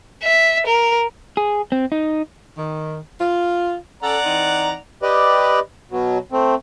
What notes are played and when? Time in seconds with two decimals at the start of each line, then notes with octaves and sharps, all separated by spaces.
0.23 E5
0.67 A#4
1.37 G#4
1.72 C4
1.92 D#4
2.58 D#3
3.20 F4
4.03 C#4 A4 D5 F#5 A#5
4.25 E3 C4 D#4
5.03 G4 B4 D5 D#5
5.91 B2 F#3
6.32 A3 C4